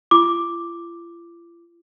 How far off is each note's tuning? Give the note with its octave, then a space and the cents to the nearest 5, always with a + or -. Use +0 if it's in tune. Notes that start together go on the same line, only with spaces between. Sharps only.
F4 -45 D6 +0